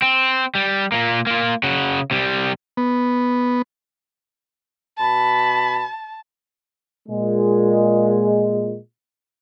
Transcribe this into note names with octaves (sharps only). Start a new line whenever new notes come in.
C4
G3
A#2 A#3
A#3 F4
C#3 F#4
C3 G3
B3
B2 A5 B5
A#2 G#3